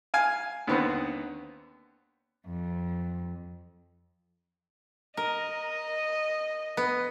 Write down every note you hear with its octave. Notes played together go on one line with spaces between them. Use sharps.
F5 G#5
D#2 D3 B3 C4
F2
A#4 D#5
B3